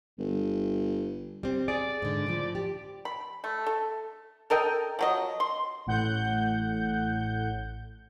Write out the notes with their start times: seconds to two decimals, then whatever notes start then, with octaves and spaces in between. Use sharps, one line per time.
0.18 G1
1.43 G3 C4
1.68 G#4 D5
2.02 G#2 D3
2.27 A2 F3
2.55 G4
3.05 B5
3.44 A3
3.66 A4
4.50 A4 A#4 D#5 G5
4.99 F3 F#3 D#5
5.40 C6
5.86 A1 A2 F#5 G6